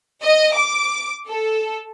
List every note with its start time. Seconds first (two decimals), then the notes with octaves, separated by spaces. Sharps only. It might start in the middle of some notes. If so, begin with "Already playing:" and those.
0.24 D#5
0.55 D6
1.28 A4